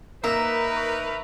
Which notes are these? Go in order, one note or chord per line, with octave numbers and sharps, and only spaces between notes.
A#3 D#4 A#4 B4 E5 A#5
C#6